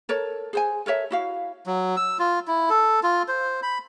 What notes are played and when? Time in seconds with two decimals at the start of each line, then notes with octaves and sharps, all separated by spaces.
0.09 A4 A#4 C#5
0.53 G#4 C5 G#5
0.86 A4 A#4 C#5 E5
1.11 E4 F#4 F5
1.66 F#3
1.97 E6
2.19 F4
2.47 E4
2.70 A4
3.03 F4
3.28 C5
3.63 B5